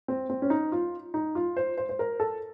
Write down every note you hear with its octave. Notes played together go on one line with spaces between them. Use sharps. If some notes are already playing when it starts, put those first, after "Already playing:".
C4
C4
C#4
D#4
F4
D#4
F4
C5
C5
C5
A#4
A4